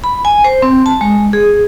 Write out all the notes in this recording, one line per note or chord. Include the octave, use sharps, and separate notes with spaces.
B5
G#5
C5
C4
A5
G#3
G#4